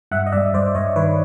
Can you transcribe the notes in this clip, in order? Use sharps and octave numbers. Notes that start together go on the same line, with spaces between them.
G2 E5 F#5
D#5
G2 D5 E5
G2 C5 D5
G2 C#5 D#5
D#3 B4 C#5